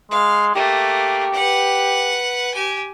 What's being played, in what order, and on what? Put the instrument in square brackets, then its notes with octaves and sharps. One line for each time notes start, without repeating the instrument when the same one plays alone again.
[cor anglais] G#3 [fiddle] F5
[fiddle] A3 A#3 [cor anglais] G4
[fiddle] B4 F#5
G4 G#5